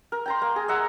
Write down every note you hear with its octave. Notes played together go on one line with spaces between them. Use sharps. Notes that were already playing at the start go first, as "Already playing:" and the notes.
A#4
G5 A#5 C6
A#3
G#4
D#5 E5 F#5 A#5